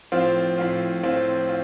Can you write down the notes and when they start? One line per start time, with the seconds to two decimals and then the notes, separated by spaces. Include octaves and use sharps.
0.12 A2 F3 C4 F4
0.58 A2 F3 C4 F4
1.03 A2 F3 C4 F4
1.49 F4